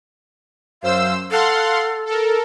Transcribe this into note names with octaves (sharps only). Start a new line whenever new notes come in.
F#2 C5 F5 E6
A4 F5 F#5 C6
A4 A#4